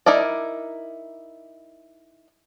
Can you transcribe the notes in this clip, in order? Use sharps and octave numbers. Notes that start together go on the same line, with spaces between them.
D#4 E4 A#4 D5